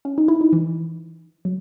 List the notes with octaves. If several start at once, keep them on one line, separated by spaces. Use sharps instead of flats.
C#4
D#4
E4
D#4
E3
F#3